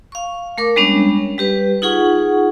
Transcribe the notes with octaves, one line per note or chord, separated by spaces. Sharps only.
F5 C#6
A3 A#4 D6
G3 G#3 B3 C#4 D4 C#5
G3 G4 B4
D#4 F4 G#4 F#5 C#6